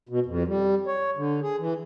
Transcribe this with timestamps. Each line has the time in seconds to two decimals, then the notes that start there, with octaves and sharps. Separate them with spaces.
0.09 B2
0.26 F2
0.47 G3
0.87 C#5
1.17 D3
1.42 G#4
1.59 E3